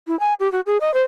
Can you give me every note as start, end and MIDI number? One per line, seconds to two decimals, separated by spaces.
0.07 0.18 64
0.20 0.34 80
0.40 0.51 67
0.52 0.61 66
0.66 0.77 68
0.81 0.94 75
0.94 1.02 72